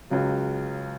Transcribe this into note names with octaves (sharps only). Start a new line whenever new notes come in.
C#2 C#3 F#3